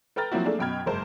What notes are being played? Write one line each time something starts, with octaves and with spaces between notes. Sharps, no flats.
A4 B4 G5 A#5 F6 A6
F3 F#3 A#3 C4 E4 F#4
A3 A#3 D4 G#4 A4
F#2 B2 G5 B5 F6 G#6
F#1 G#2 A#4 C5 A5